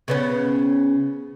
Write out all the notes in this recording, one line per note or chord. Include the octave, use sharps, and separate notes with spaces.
C#3 B3 C#4